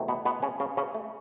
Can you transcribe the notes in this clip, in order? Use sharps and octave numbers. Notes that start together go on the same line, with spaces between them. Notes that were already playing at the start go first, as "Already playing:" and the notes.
Already playing: E2 C3 D#3 F#3 A3
B2 B3
B2 B3
C#3 C#4
C#3 C#4
C#3 C#4
A3